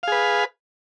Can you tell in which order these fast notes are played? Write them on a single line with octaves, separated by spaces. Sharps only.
F5 G#4 B4